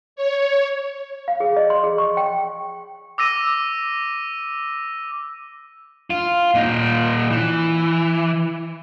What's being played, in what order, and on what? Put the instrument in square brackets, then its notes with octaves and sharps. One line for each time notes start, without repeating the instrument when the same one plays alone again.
[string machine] C#5
[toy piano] F5
G#4
D#5
C6
G#4
C#6
G5
[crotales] D6 E6 A#6 D#7
[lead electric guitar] F4
A#2 D#4
E3